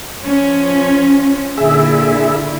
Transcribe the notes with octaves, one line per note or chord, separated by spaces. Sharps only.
F3 C#4
A#2 D3 E4 G#4 E5